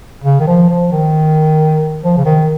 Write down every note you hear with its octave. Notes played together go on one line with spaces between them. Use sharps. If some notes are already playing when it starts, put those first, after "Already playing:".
C#3
D#3
F3
F3
D#3
F3
C#3
D#3